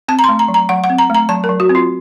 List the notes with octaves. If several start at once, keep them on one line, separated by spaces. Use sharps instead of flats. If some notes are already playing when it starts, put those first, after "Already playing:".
C4 A5
A#5
C6
A3
A#5
F#3
A#5
F#3 F#5
F#5
C4
A#5
A3 A#5
F#3 A5
A#4
F#3
F#4
C4
F4